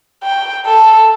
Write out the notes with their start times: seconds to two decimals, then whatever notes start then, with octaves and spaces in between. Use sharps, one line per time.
0.23 G5
0.66 A4